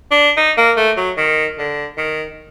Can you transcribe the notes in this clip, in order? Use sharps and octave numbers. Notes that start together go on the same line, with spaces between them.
D4
D#4
A#3
A3
F#3
D#3
D3
D#3